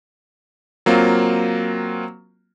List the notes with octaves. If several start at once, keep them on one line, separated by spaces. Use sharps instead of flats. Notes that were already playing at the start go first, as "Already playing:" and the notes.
F#3 A#3 C4 F4